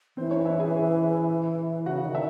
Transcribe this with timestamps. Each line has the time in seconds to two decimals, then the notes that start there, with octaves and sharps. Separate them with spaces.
0.17 E3 C4 C5
0.31 C#4 C#5
0.45 E4 E5
0.59 G#4 G#5
1.86 C#3 F#4 F#5
2.05 D#3
2.15 E5